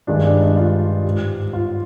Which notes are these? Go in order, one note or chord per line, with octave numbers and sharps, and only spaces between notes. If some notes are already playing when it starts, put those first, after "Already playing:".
G2 D#3 G#3 D4
D4
D#4
F4
G#2 G3
F4